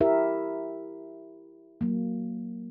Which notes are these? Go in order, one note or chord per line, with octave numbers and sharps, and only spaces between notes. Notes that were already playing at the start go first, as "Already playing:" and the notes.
E4 G4 A#4 E5
F#3 A#3